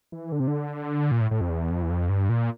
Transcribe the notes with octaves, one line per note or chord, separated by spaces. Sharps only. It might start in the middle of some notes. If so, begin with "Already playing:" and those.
E3
D3
C3
D3
A#2
A2
A2
F2
E2
F2
E2
F2
G2
A#2